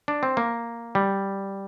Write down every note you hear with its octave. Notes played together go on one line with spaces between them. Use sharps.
D4
C4
A#3
G3